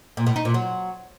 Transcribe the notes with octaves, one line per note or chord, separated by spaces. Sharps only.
A#2
A2
D#4
A#2
F#3